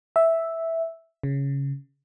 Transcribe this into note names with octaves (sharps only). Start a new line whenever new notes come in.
E5
C#3